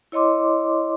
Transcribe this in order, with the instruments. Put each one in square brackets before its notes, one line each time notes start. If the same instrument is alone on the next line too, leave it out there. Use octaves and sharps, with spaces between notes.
[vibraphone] E4 C#5 D#5 C6 D6